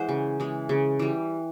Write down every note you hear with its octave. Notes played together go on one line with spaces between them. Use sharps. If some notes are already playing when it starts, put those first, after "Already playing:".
Already playing: E3 G#3 C5 F#5
C#3
E3 G#3
C#3
E3 G3